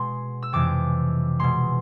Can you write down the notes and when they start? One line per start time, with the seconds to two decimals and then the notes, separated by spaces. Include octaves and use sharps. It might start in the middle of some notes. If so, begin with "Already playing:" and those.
Already playing: B2 G#3 C6
0.43 E6
0.53 F2 C3 E3 G#3 D6
1.40 B2 G#3 C6